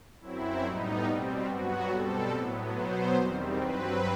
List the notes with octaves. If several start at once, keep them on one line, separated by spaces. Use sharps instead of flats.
F#2 F#3 C4 E4
A2 G3 B3 D#4
B2 G3 C4
G2 F#3 B3 F#4
B2 G3 C4 A4
A2 F#3 B3
B2 F#3 B3 C5
E2 D#3 G3 C4
G2 F#3 C4 B4